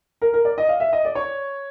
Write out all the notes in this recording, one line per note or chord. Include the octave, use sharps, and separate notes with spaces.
A#4
A#4
D5
D#5
F5
E5
D#5
D5
C#5